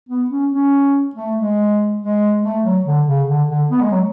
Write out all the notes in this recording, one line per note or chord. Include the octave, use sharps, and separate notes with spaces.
B3
C#4
C#4
A3
G#3
G#3
A3
F#3
D3
C#3
D3
D3
B3
G#3
F#3